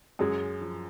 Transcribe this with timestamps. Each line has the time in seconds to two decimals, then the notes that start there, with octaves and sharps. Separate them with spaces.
0.19 F#2 G#3
0.61 F3